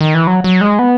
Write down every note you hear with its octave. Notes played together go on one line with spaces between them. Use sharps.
D#3
E3
F#3
F#3
G#3
B3